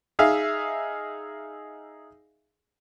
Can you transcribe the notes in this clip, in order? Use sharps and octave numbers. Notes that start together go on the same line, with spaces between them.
D#4 G#4 E5 F5